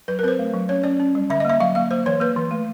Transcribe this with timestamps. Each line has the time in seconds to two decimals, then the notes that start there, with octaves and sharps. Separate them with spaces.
0.08 F#3 B4
0.19 A#4
0.23 C4 B4
0.28 C5
0.39 A3
0.54 F#3
0.69 C#4 C#5
0.84 C#4 D5
1.00 C#4
1.15 G3
1.30 D3 E5
1.40 D#5
1.45 A#3 E5
1.60 F#3 F5
1.75 A#3 F5
1.91 A#3 C5
2.06 E3 C#5
2.20 A#3 B4
2.36 E3
2.51 A3